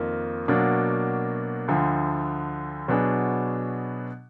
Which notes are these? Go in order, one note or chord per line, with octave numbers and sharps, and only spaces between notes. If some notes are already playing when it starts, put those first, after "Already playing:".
Already playing: F2 D#3 A#3 F4
B2 F#3 A#3 D4
D2 D3 F3
B2 F#3 B3 D4 G#4